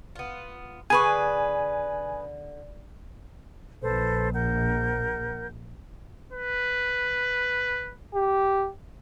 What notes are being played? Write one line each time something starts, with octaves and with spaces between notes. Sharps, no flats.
B3 F4
D3 G#4 B4 G#5 C#6
A#1 A4 B4 C5
A#4 F#5 G6
B4
G4